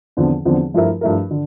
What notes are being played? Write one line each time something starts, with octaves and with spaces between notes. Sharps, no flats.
E2 D3 F3 C4
E2 D3 F3 C4
G2 F3 A3 E4 A#4
G2 F3 A3 E4 A#4
D3